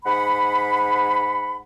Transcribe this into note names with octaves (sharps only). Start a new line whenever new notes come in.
G#2 F#5 B5